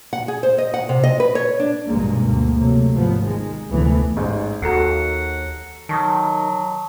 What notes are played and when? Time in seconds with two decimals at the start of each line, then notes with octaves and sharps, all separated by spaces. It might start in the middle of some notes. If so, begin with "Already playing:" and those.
0.13 F#5
0.28 G#4
0.43 C5
0.58 D#5
0.74 F#5
0.89 C3
1.03 D#5
1.20 B4
1.35 C#5
1.60 D4
1.86 A#1 G2 B2 D#3 G#3 A#3
2.23 D2 A#3
2.56 C3 F#3 A3 A#3
2.94 G#1 F3 B3
3.25 D#3 G#3
3.70 F1 D2 E3 B3
4.16 A1 G#2
4.62 D#2 F#4 A4 F#5 A#5 C7
5.89 D#3 F#3 A5 C#6 D#6